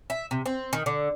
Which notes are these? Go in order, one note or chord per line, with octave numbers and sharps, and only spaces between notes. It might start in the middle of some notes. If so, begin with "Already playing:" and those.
E5
C3
C4
D#3
D3